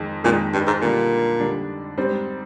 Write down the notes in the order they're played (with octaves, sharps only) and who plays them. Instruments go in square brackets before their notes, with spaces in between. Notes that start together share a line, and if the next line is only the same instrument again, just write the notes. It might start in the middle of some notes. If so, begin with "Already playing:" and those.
Already playing: [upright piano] F2 D#3 G#3
[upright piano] F2 D#3 G#3 [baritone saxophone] A#2
[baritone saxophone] G2
G#2
[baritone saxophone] A#2 [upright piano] D3 G3 D4
[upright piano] D3 G3 D4
G#2 G3 C4